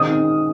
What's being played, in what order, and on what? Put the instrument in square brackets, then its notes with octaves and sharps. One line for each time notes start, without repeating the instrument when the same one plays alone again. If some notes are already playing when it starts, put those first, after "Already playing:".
Already playing: [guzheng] D#3 G#3 C4 D#4 [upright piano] D#6